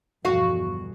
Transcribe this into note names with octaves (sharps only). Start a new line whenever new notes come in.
G1 E2 G2 B2 F3 F#4 F5